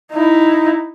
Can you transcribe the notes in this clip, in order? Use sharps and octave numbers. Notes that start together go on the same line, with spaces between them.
D#4 E4